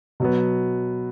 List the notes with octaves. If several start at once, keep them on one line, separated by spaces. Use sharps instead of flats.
B2 F#3 B3